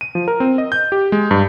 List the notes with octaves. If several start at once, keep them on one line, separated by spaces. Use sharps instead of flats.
D#7
F3
A#4
C4
D#5
G6
G4
G#3
G2